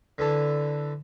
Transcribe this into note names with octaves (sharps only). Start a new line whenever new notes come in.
D3 E3 A4